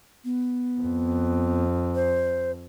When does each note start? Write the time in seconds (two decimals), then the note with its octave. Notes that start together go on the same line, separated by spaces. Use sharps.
0.25 B3
0.81 F2
1.95 C5